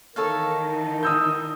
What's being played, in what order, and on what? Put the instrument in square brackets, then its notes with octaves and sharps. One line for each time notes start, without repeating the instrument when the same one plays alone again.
[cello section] D#3 D#4 [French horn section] E3 E4 A#4 [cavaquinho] A4 C#5 F5
[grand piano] D#6 E6 G6